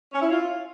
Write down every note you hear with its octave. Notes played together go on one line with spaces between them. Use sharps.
C#4
E4
F4